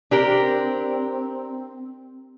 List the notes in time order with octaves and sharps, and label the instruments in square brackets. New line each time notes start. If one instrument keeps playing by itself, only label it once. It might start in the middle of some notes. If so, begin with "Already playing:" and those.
[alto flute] C4 [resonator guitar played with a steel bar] D4 G4 A#4